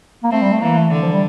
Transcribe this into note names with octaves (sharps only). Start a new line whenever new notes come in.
A#3
A3 C4
G3
A3
E3 A#3
A3
D3
F3
G3